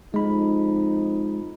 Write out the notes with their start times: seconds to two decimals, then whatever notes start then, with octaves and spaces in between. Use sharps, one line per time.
0.14 F2 G#3 D#4 B5